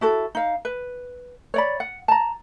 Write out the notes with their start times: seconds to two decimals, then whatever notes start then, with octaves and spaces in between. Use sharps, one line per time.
0.01 E4 F#4 A4
0.35 D#4 F5
0.65 B4
1.54 C#5 D5 B5
1.80 F#5
2.08 A5 A#5